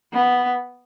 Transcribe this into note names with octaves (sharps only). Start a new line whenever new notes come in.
B3